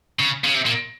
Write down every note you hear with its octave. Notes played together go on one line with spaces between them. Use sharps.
C#3
C#3
C3
A#2